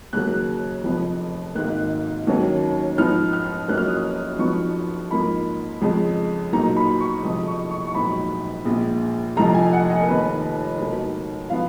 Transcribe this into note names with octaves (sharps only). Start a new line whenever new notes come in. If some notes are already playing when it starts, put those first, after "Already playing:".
D#2 C#3 F#3 A#3 F#6
F1 F2 F3 B3
G#1 G#2 D#3 A#3 F#6
D#2 D#3 F#3 A#3 C#4
G#2 F3 B3 D#4 F6
F6
F#1 F#2 F3 A#3 C#4 F#6
F6
D#6
F6
F#1 F2 F3 B3 D#4 C#6
G#2 F3 A#3 B5
F2 C#3 G#3
B1 A#2 F#3 A#3 D#4 A#5
B5
C#6
F1 F2 C#3 D#6
C#6
C#6
C#6
A#1 G#2 F#3 B3 B5
A#1 A#2 G#3
F1 F2 F3 A#5
G#5
F#5
D#5
A#4
F1 D#2 D#3 B4
C#2 B2 A#3 D#4
F3 B3 F5